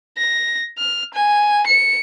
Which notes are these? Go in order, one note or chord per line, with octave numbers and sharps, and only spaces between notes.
A#6
F6
G#5
C#7